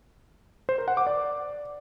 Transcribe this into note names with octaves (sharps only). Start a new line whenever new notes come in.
C5
A#4
F#5
D6
D5